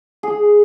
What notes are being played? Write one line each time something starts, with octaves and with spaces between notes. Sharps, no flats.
G#4